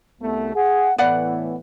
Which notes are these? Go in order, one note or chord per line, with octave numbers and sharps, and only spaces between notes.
C2 A3 B3
G#4 F#5
A2 E3 B3 B4 D5 F#5